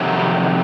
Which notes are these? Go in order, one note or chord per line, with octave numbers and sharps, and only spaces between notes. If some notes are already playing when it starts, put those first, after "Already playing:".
Already playing: F2 C3 D#3 F#3
G3